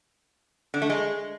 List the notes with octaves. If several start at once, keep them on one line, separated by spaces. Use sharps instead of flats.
D3
A3
G#3